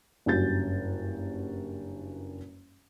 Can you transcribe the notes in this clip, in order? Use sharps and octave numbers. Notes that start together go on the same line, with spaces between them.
F#1 G2 C#4 F#4 G6 A6